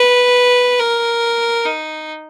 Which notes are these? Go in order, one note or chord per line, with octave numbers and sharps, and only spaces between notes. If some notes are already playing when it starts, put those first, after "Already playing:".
Already playing: B4
A#4
D#4